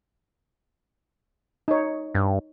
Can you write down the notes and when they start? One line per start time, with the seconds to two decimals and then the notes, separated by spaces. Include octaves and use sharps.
1.68 D#4 C#5
2.15 G2